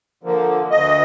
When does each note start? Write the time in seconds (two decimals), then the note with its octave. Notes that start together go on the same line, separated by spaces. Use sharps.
0.23 D3 F3 A#3
0.70 D2 D#5